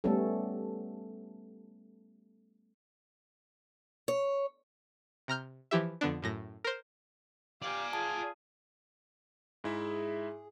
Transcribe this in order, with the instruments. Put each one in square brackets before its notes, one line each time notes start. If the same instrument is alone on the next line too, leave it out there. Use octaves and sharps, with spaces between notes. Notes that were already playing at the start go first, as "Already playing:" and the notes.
[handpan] G3 A3 B3 C#4 A4
[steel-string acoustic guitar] C#5
[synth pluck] C3 A#5 F6 G6
E3 F3 E4 G4 E5
F2 D3 B3 D4
F#2 A2 A#6
A#4 C5
[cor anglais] G4 [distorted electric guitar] D5 G#5 [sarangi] F5
[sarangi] F4 [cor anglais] G#4 [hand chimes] A5
[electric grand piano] G#2 E4 E5 [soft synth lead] G#4